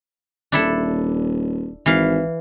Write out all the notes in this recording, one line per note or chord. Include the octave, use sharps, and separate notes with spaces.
D#1 D4 E4 A4
G#1 E3 F5